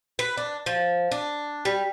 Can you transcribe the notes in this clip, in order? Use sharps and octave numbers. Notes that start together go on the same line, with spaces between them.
B4
D4
F3
D4
G3